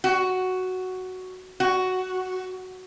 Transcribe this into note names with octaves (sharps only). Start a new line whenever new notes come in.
F#4
F#4